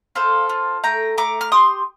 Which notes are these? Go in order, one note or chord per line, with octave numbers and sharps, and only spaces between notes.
F4 A4 C5
F4
A3 G5 A#5
A3 A#5 D6
F6
G4 C6 D#6